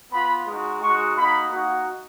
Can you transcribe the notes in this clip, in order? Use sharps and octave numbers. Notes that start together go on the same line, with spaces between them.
B3 F4 B5
G#3 D#4 F#4
G#3 D#4 F#4 C#6
A#3 D#4 F#4 B5
A#3 D#4 F#4